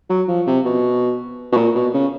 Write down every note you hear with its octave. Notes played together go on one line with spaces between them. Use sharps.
F#3
F3
C3
B2
B2
A#2
B2
C#3